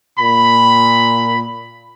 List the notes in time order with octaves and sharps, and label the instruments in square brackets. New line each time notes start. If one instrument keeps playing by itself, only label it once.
[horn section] A#2 B5